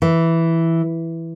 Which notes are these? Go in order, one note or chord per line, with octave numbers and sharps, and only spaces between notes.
E3